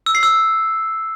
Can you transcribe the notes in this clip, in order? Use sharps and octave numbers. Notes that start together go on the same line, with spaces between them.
E6
C7
E6